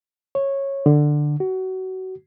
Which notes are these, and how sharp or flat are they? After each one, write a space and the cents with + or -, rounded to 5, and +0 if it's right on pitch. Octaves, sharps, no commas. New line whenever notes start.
C#5 -10
D3 +10
F#4 +25